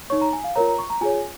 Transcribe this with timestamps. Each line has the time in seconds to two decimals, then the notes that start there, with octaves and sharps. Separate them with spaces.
0.10 D#4 C#5 C#6
0.21 A#5
0.33 G#5
0.44 F5
0.56 F4 A#4 C#5 A#5
0.67 A#5
0.79 C#6
0.90 A#5
1.01 F4 G#4 C#5 G#5